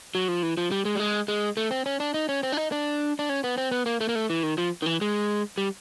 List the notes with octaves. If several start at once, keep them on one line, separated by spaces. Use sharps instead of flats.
F#3
F3
E3
F3
G3
G#3
G3
G#3
G#3
A3
C4
C#4
D4
D#4
C#4
C4
D4
D#4
D4
D4
C#4
B3
C4
B3
A#3
A3
A#3
A3
E3
D#3
F3
D#3
E3
G#3
G3